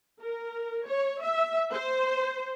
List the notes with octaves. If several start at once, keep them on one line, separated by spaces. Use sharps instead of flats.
A#4
C#5
E5
C5